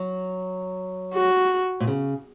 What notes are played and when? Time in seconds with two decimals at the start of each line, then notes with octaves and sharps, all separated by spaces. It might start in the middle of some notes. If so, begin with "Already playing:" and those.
Already playing: F#3
1.14 F#4
1.80 A#2
1.87 C#3